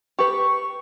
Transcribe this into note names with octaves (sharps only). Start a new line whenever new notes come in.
G4 B4 C#6